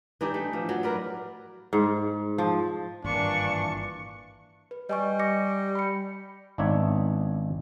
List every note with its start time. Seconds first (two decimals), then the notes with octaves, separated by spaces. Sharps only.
0.21 E3 D4 D#4 G4
0.34 A3
0.53 F3
0.69 F#3
0.83 A#4 B4 D5
1.73 G#2
2.38 F3
3.05 G#1 G2 A#2 E3 A#3 D4 C#6
4.71 B4
4.90 G3 D#5 G#5 C#6
5.19 D6 A#6 C#7
5.75 B5 C#7
6.58 G#1 B3 D4 D#4 C#5 E5